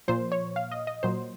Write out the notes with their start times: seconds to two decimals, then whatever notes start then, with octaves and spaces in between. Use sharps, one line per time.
0.08 A#2 F3 C5
0.32 C#5
0.56 F5
0.72 D#5
0.87 D#5
1.03 A#2 F#3 C5